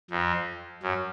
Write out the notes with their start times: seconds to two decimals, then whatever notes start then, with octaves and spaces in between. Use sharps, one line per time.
0.11 F2
0.82 F#2